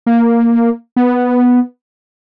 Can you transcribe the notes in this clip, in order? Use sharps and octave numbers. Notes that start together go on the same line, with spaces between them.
A#3
B3